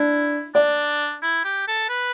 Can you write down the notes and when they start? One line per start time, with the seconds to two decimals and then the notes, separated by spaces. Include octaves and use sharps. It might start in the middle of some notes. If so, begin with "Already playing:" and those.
Already playing: D4 E4
0.55 D4 D5
1.22 E4
1.44 G4
1.67 A4
1.89 B4